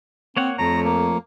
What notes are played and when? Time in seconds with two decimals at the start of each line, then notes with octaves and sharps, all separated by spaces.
0.37 A#3 C4 C#5 F#5
0.58 F2 F3 A3 C#5 A#5
0.84 A#3